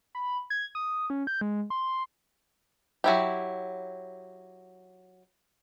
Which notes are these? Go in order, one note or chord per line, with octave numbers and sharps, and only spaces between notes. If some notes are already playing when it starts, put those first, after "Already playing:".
B5
G#6
D#6
C#4
G6
G#3
C6
F#3 E4 G4